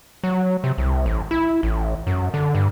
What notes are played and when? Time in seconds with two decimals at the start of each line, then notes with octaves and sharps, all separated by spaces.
0.24 F#3
0.64 C3
0.78 C2
1.06 A1
1.31 E4
1.63 A1
2.07 F#2
2.34 D3
2.55 G2